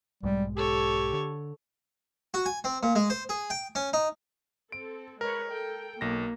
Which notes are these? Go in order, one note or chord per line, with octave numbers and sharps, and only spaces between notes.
B1 G#2 G3 G#3
G4 A4 C#5
D3
F#4
G#5
C4
A#2
G#3
C5
G#4
G5
C#4
D#4
C4 A4 D7
G#3 A#4 B4 C#5
A4 G5
B1 A#3 A#6